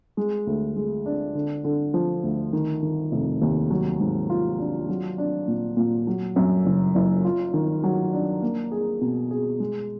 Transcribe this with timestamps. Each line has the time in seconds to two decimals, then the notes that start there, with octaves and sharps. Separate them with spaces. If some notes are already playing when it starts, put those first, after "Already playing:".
0.17 G#3
0.47 D2
0.76 G#3
1.06 D4
1.35 D3
1.64 D3
1.94 F3
2.23 D2
2.53 D#3
2.82 D#3
3.12 F1
3.41 D#2
3.71 F#3
4.00 G#2
4.30 F4
4.59 D4
4.89 F#3
5.18 D4
5.48 A#2
5.77 A#2
6.07 F#3
6.36 F#2
6.66 F#1
6.95 F#1
7.25 F4
7.54 D#3
7.84 F#3
8.13 D4
8.42 A#3
8.72 G#4
9.01 B2
9.31 G#4
9.60 G#3